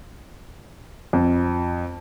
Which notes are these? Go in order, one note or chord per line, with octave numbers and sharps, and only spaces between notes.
F2